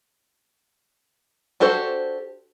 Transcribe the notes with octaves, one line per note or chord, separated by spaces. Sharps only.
D4 F#4 G4 A4 C5